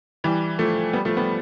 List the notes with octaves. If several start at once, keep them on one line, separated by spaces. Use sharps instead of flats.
E3 G3
F3 A3
G3 B3
F3 A3
G3 B3